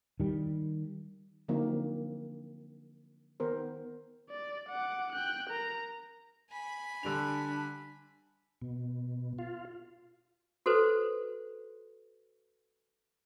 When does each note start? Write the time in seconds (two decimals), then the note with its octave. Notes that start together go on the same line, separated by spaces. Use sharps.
0.20 D#3 G3
1.48 D3 F3 F#3 A#3 C4 D#4
3.40 D#3 B3 A#4 C5
4.30 D5
4.69 F#5 D6
5.12 G5 F#6
5.49 A#4 A#5
6.51 G#5 B5
7.03 D3 G3 D4 F7
8.62 B2
9.39 F4
10.66 F#4 A4 B4 C5